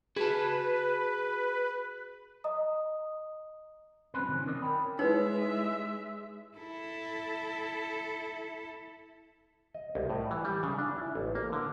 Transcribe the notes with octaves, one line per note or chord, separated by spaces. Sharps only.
F#4 G#4 B4 A5
D#5 A#5 D#6
F#3 C4 C#4 B4
C3 D#3 E3 F#3 C#4
C4 C#4 A#4 D5 D#5
A#4 C#5 G5 B5
G#3 D#4 E4 B4 C#5 E5
E4 A4
D#5
C2
A2
E3
G3
C#3
D4
E4
A1
A#3
D3